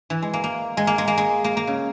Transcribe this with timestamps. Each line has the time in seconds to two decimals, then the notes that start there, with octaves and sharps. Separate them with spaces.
0.10 E3
0.22 G#3
0.33 A#3
0.44 A#3
0.77 G#3
0.87 A#3
0.98 G#3
1.08 A#3
1.17 G#3
1.44 A#3
1.57 A#3
1.67 C#3